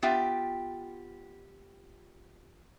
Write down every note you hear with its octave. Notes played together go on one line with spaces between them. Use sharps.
B3 F4 G4 E5 G5